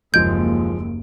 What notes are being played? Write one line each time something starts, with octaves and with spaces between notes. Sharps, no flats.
F#1 D#2 F3 G#3 G6 D7